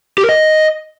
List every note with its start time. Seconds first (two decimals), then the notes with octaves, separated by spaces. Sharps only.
0.18 G4
0.23 A#4
0.29 D#5